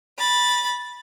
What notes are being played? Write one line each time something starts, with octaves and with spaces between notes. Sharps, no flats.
B5 A6